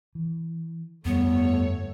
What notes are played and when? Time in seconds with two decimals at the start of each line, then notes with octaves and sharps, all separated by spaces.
0.15 E3
1.05 G1 F2 G3 A3 B3 C#5